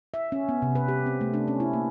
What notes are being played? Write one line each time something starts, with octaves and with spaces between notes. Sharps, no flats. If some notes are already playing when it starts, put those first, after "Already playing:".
E5
C#4
B3
C3
B4
G4
C4
A3
D4
C#4
E4
A#3